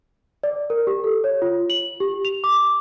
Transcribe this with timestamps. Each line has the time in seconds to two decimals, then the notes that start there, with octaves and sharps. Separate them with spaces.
0.43 D5
0.70 A#4
0.87 G4
1.04 A4
1.24 C#5
1.42 F4
1.70 F#7
2.00 G4
2.25 F7
2.44 D6